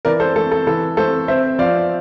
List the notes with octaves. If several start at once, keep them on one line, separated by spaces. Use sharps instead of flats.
E3 A#4 D5
A4 C5
A3 A4
A4
E3 A4
A3 A4 C5
C4 C5 E5
F3 D5 F5